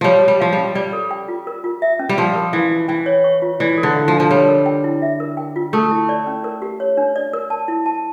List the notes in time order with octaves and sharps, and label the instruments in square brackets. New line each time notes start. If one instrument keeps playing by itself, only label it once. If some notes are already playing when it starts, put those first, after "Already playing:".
[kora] F3 G3 [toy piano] C#5
[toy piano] G4
[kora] G3
[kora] F3 [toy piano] F5
[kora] G3 [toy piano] C#4
[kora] G3 [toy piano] D5
[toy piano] A4
G5
F4
A#4
F4
E5
C#4
[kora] G3
[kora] F3 [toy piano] D5
[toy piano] A#4
[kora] E3 [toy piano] F5
[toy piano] E4
[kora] E3 [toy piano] G5
[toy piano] C#5
C#6
F4
[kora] E3 [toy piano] D5
[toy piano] A4
[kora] D3
[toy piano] F5
[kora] F3
[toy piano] D4
[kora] F3
[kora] G3 [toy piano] C#5
[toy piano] A#4
G5
E4
E5
A#4
G5
F4
[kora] A3 [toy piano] A4
[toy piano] E4
D5
C#4
A#4
G4
C#5
D4
D5
A#4
A5
E4
A5